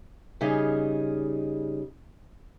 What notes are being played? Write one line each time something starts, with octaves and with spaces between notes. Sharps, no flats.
C#3 G3 D#4 G#4 D#5 F5